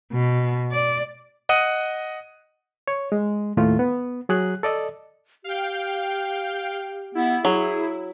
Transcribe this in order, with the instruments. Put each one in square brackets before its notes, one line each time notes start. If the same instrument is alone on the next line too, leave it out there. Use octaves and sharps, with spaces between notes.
[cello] B2
D5
[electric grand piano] D#5 F#5 D#6 D#7
[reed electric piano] C#5
G#3
D#2 A2 A3 F4
B3
F#3 G#4 F#6
A4 D5 D#5
[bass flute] G4 [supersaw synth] F5 G5
[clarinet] B3 [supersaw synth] E4
[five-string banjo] F#3 [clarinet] G#4